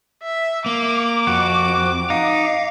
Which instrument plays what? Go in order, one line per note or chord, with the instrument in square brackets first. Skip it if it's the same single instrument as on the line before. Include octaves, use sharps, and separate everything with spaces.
[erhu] E5
[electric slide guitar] A#3 [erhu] D6
[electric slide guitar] F2 [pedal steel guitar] F#4
[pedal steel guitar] D#4 [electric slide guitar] F5